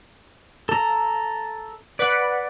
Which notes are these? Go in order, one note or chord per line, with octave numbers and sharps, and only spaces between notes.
A4 A#5
B4 D5 F#5